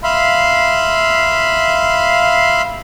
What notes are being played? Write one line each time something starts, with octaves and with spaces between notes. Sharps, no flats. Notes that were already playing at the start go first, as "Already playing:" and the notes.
E5 F5 B5 C6